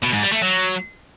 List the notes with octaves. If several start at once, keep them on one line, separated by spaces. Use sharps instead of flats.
B2
G#2
G3
A3
F#3